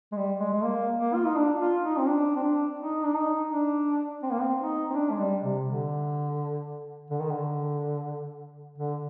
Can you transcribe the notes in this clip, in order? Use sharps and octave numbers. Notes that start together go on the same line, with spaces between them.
G#3
G3
G#3
G#3
A#3
A#3
F4
D#4
D4
F4
D#4
C4
D4
C4
D4
D#4
D4
D#4
D4
C4
A#3
C4
D#4
C4
D4
G#3
G3
C3
D3
D3
D#3
D3
D3